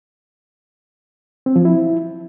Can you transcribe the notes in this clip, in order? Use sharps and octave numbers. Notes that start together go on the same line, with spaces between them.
C4
F3
E4